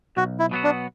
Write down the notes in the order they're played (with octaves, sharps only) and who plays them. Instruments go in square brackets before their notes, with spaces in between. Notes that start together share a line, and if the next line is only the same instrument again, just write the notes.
[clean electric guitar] B1 [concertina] F#4
[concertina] E4
[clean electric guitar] B2 F#3 B3 F#4
[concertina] D4